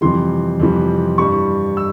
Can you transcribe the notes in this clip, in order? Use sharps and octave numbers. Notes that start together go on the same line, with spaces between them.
F2 C3 E3 G3 C6
F2 C3 E3 G3
G2 G3 C#6
E6